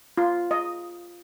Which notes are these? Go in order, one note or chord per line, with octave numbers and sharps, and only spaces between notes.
F4
D#5